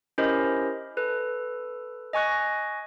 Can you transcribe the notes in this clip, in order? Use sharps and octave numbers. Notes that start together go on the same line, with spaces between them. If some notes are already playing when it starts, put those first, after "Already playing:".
C#4 E4 G4 A#4 C5 D#5
A4 B4
D#5 G#5 C#6 F#6 A#6